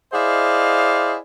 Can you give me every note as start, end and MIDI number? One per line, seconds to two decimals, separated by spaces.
0.12 1.16 64
0.12 1.16 68
0.12 1.16 72
0.12 1.16 74
0.12 1.16 75
0.12 1.16 77